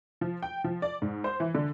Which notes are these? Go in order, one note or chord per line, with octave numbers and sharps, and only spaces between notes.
F3
G5
F3
D5
G#2
C5
E3
D3